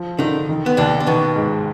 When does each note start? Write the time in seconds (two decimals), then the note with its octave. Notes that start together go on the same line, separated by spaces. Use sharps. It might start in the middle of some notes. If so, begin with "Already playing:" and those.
Already playing: F3
0.19 D3 D#3 D#4
0.49 D#3
0.66 B3
0.77 D#2 D3 D4
1.00 D4
1.07 B2 D#3 B3
1.36 G#2